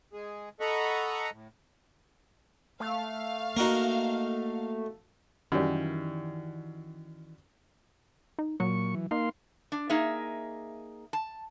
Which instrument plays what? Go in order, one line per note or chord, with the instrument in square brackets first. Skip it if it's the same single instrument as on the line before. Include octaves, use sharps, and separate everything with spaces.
[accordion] G#3 G#4
A4 D#5 F#5 A#5 B5 C#6
A2
[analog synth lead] A3 [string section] F5
[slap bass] A#3 [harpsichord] D#4 F#4 A#4
[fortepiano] F#2 G3 [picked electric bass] D#3 E3
[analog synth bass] D#4
[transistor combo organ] A#2 C#6 [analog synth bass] F#3
[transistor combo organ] E3
[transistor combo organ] A#3 F5 C6 [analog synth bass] D#4
[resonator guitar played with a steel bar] D4
A#3 D#4 G#4 E5
A5